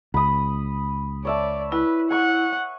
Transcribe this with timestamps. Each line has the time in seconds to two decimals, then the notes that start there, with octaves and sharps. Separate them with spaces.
0.14 C#2 B5 D#6
1.25 C#5 D5 E5 A5
1.72 E4 B4 G#5
2.10 F#5 G#5 C#6